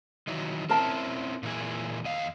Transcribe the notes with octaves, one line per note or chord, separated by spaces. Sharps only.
D#3 E3 F#3
C4 C#4 E4 A#4 A5
A#2 E3 G#4
E2 D#5 F5